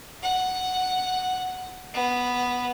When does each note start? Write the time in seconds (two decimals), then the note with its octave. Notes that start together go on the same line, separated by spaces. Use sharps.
0.23 F#5
1.94 B3